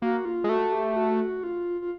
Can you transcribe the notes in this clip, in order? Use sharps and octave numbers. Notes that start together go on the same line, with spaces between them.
A#3 F#4
F4
G#3
A3 F#4
G4
F#4
F4
F4